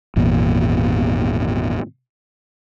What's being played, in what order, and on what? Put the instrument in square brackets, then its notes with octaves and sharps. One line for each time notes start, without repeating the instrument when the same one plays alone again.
[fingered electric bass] G#1 E2 A#2